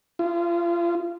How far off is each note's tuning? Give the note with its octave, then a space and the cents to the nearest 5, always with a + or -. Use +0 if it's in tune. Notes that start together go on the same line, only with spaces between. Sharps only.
F4 -30